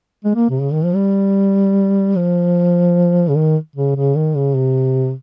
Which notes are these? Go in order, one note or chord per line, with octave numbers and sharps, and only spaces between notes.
G#3
A#3
C3
C#3
D#3
F3
G3
F3
C#3
D#3
C#3
C#3
D#3
C#3
C3